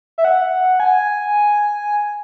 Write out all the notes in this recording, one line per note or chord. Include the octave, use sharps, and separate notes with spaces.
E5
F#5
G#5